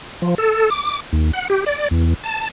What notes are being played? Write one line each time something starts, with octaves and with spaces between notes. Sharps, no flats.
F3
A4
D6
D#2
F#5
G4
D5
E2
A5